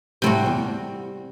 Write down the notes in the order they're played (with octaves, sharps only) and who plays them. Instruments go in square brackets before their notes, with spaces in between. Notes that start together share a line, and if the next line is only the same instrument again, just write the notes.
[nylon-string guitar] A2 [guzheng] C3 G3 C4 F#4
[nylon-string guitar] E2